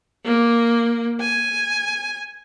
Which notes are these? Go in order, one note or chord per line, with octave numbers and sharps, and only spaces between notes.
A#3
G#5